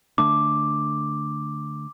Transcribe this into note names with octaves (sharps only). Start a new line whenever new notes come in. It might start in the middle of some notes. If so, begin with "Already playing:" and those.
D3 A3 D4 D6